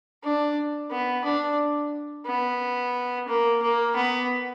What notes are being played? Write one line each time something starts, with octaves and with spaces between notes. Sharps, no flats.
D4
B3
D4
B3
A#3
A#3
B3